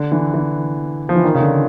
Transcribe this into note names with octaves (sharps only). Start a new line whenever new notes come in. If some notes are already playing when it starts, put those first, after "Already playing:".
Already playing: D3
E3
E3
F3
E3
D#3
C#3
D3